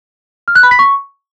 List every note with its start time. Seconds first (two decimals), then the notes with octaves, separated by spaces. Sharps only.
0.48 F6
0.55 F#6
0.63 B5
0.71 B6
0.79 C#6